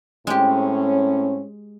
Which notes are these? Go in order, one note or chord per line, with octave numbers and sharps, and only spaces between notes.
A2 G#3 C4 C#4 G4